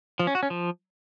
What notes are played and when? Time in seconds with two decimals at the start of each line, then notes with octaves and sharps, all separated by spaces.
0.19 F3
0.27 C#4
0.35 F#4
0.43 C#4
0.50 F3